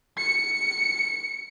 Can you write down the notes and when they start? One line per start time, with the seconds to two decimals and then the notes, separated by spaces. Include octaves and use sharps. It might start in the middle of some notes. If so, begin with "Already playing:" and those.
0.18 C#7